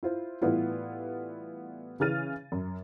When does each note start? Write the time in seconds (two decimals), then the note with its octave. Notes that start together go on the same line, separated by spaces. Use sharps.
0.03 E4 F4 C5
0.42 A2 E3 G3 B3 E4 F4
2.00 C#3 E3 G#4 F6 A6 D#7
2.52 F#2